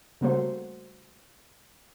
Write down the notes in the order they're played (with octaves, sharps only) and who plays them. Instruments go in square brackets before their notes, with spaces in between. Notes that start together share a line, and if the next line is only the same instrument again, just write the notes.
[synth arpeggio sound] C#3 G3 A3 A#3 F#4 C5